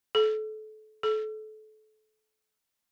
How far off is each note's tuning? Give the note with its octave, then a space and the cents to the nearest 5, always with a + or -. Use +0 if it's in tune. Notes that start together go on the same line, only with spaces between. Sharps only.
A4 -30
A4 -30